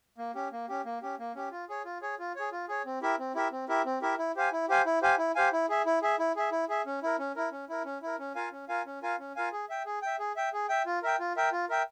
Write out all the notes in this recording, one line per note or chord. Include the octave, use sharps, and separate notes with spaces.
A#3
C#4 G4
A#3
C#4 G4
A#3
C#4 G4
A#3
C#4 G4
F4
G#4 C#5
F4
G#4 C#5
F4
G#4 C#5
F4
G#4 C#5
C4
E4 G4 A#4 E5
C4
E4 G4 A#4 E5
C4
E4 G4 A#4 E5
C4
E4 G4 A#4 E5
E4
G4 C5 F5 G#5
E4
G4 C5 F5 G#5
E4
G4 C5 F5 G#5
E4
G4 C5 F5 G#5
E4
G#4 E5
E4
G#4 E5
E4
G#4 E5
E4
G#4 E5
C#4
E4 A#4
C#4
E4 A#4
C#4
E4 A#4
C#4
E4 A#4
C#4
F4 A#4 F5 G#5
C#4
F4 A#4 F5 G#5
C#4
F4 A#4 F5 G#5
C#4
F4 A#4 F5 G#5
G#4
E5 G5
G#4
E5 G5
G#4
E5 G5
G#4
E5 G5
F4
A#4 E5 G5
F4
A#4 E5 G5
F4
A#4 E5 G5